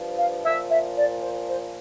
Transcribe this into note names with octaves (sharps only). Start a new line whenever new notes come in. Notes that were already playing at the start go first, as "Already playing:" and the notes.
Already playing: G2 F3
F5
A#2 F3 E5
E5
D5
C5
C5